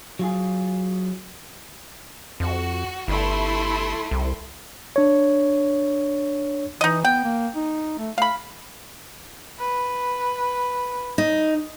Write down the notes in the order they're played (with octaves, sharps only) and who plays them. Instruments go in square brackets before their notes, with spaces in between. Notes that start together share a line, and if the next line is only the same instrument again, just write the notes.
[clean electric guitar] F#3 F4 G#4
[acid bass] F2 [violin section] F#4
[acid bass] G1 [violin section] A3 E4 C6
[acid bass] C2
[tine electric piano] D4 C#5
[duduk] E3 [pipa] D#4 D#5
[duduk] B3 [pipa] G5
[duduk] A#3
D#4
A3
[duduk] A3 [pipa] F5 B5
[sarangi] B4
[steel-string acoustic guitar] D#4